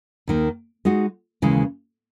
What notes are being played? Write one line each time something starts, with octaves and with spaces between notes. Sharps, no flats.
D#2 D#3 A#3
G#3 D#4 F#4
D#2 C#3 E3 G#3